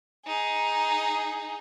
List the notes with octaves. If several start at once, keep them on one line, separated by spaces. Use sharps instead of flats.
D#4 G#4